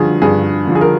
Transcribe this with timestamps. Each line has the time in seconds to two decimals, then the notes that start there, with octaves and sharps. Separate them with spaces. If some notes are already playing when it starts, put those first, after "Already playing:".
Already playing: G2 D3 F3 G#4
0.22 G2 G#4
0.67 D3 F3
0.75 G#4
0.81 A#4